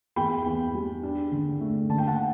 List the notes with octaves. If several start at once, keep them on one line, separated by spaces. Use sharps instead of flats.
E2 G5 B5
E2
G3
D4
D3
A3
D3 A5
G5
F#5 A5